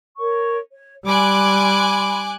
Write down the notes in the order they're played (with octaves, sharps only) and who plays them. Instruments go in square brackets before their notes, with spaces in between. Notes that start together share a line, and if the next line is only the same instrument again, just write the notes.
[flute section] A#4 C#5 C#6
C#5
[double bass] G3 [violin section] G#5 D6 F#6 [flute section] B5 C6